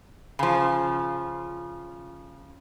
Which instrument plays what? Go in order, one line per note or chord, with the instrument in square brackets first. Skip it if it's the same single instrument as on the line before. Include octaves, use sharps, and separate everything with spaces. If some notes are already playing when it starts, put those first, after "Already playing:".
[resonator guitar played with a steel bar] C#3 F3